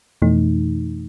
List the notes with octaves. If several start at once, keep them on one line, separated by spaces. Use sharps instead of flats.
F2 B2 E3 A3 D#4